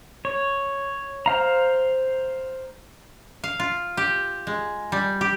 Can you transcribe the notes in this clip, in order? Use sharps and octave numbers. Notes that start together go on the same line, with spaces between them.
C#5
C5 F5 A#5
F5
F4
G4
G#3
G3
G4